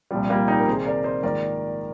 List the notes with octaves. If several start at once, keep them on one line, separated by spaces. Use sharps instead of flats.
C2 A#2 F3 G3
G3 A#3
D#4 G4
A#4
C2 C3 D#3 G#4 C5
A#4 D5
C5 D#5
A#1 G#2 D#3 A#4 D5